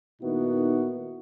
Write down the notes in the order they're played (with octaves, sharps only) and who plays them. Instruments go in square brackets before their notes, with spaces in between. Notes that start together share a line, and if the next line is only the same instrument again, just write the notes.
[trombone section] A#2 D#3 B3 D#4 E4 F#4